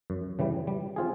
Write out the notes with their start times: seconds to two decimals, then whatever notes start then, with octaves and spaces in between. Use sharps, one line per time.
0.10 F#2
0.39 C#3 E3 G3
0.67 G3
0.96 C4 F4 G#4